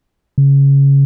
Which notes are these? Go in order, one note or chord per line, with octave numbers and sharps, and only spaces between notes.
C#3